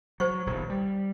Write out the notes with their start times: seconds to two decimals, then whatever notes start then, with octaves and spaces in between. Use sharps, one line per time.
0.20 F#3 C5 C#6
0.46 D#1 B1 D#3
0.70 G3